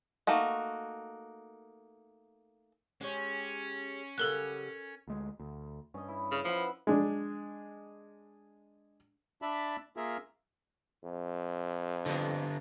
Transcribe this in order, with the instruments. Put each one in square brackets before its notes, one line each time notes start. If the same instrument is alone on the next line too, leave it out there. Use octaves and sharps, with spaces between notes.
[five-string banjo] A3 A#3 D#4 F#4
[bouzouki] G#3 G4 C#5 [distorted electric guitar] C#4
[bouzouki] C#3 F#3 G3 [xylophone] A4 A#4 F#6
[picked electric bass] D2 G#3
D2
[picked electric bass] G2 [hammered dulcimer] C#4 D#5
[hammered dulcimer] E4
[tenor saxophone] C#3
[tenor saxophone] F3 [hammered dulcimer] B4 E5 F#5
[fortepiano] G#3 D4
[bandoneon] D4 D5 E5 A5 B5
A#3 F4 G#4 A#4 E5
[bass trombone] F2
[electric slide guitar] D3 B3